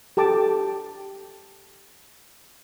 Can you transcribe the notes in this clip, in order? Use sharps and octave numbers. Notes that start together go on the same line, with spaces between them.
G4 A4 A5 D6